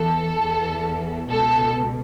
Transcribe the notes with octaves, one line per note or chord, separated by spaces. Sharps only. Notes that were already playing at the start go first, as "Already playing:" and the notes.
Already playing: E2 E3 A4
E2 E3
C#2 B2 A4